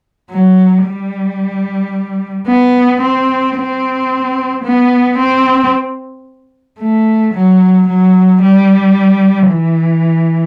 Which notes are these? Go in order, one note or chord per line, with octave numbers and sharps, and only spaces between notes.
F#3
G3
B3
C4
C4
B3
C4
A3
F#3
F#3
G3
E3